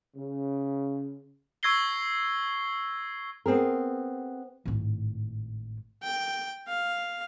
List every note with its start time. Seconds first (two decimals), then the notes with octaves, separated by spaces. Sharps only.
0.14 C#3
1.63 C#6 E6 G#6 A#6 C7 G7
3.46 B3 C4 G#4 A#4
4.65 G#1 A2
6.03 G5
6.68 F5